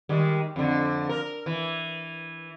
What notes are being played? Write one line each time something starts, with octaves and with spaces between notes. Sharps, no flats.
D#3 G3 G#3
F2 D3
A#4
E3